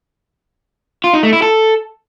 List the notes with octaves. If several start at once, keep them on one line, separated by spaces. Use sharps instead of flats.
F4
D#4
A3
E4
A4